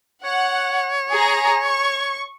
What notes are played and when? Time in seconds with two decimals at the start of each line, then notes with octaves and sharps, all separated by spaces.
0.25 C#5 F#5
1.11 G#4 A#5
1.66 C#6